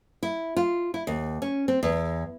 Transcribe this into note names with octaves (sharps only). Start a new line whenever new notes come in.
E4
F4
E4
D#2
C#4
C4
E2